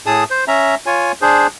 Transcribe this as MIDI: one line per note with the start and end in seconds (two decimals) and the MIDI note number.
0.06 0.24 45
0.06 0.24 68
0.06 0.24 81
0.06 0.24 87
0.31 0.45 72
0.48 0.75 61
0.48 0.75 76
0.48 0.75 82
0.86 1.12 65
0.86 1.12 73
0.86 1.12 80
1.22 1.47 62
1.22 1.47 68
1.22 1.47 72